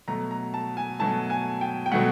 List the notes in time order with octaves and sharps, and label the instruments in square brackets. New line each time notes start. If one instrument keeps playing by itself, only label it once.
[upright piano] B2 F#3 A3 A#5
A#5
A5
G#5
B2 F#3 A3 A5
G#5
G5
G5
B2 F#3 A3 F#5